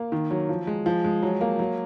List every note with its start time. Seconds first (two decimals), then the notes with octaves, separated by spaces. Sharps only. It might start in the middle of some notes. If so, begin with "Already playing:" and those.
Already playing: A#3
0.12 D#3
0.31 F#3
0.49 F3
0.67 G#3
0.86 F3
1.04 G#3
1.23 F#3
1.41 A#3
1.59 F#3